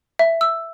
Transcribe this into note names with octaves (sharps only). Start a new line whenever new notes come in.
E5
E6